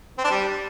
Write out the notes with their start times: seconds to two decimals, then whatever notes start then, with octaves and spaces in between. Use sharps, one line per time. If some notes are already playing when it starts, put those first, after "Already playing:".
0.18 C4
0.24 D4
0.30 G3